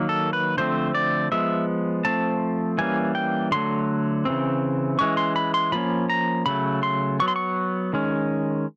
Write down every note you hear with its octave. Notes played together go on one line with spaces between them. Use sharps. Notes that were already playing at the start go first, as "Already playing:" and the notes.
Already playing: D#3 F#3 A#3
A4
B4
D3 F3 A3 C4 C5
D5
F3 G#3 B3 E5
F3 A3 C4 A5
E3 G3 A#3 C#4 G#5
G5
D3 F#3 A3 C6
C#3 E3 A3 C4
E3 G#3 C#4 C#6
C6
B5
C6
F3 A#3 C#4 B5
A#5
C#3 F#3 A3 B5
C6
F#3 B3 C#6
C6
C#6
D#3 G#3 C#4